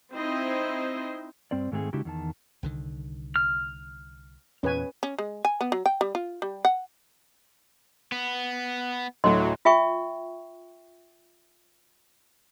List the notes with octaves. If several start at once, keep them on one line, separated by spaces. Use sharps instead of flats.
C4 D#4 E4 C5 D#5
G2 C4 C5 D5
G#2 D#3 G#3 A3 C4 G#4
C#3 G#3 D4 E4 F#4 G4
E2 D#3 A5
C2 D3 D#3
F6
E2 A#2 C#4 B4 G#5
C#4
G#3
G#5
B3
F#3
G5
G3
F4
G3
F#5
B3
D2 A2 F#3 D#5 C6
F4 E5 G5 C#6